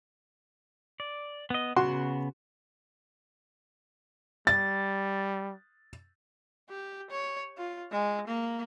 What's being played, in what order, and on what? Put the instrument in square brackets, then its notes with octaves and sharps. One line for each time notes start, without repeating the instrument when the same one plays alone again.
[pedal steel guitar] D5
B3 D#5
[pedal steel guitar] C#3 B3 [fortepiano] F#4 F#5 C6
[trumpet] G3 [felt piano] A6
[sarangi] G4
C#5
F4
G#3
A#3